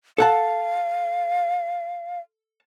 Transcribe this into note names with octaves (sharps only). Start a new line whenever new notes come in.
A4 F5 F#5 A5